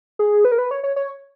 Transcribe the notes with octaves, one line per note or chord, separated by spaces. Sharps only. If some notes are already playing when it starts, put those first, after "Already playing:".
G#4
B4
A#4
B4
C#5
C#5
C#5